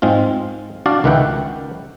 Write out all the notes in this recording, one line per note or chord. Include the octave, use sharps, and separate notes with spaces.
G#2 G#3 C4 F4
D4 F#4 D5 F5
C#2 D#3 B4 E5 F#5 G5